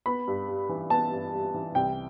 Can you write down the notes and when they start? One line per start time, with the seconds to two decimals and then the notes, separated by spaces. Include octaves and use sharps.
0.06 B3 B5
0.27 G2
0.48 G3
0.69 E3
0.90 B3 A5
1.12 G2
1.32 G3
1.54 E3
1.75 C2 G5